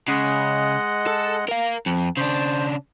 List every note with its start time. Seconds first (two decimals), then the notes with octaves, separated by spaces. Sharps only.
0.08 C#3 G#3 D#5 F#5
1.07 A4
1.49 A#4 F5
1.86 F2
2.17 C#3 D4 C5